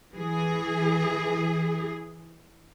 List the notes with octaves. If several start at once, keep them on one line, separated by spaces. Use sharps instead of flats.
E3 G#4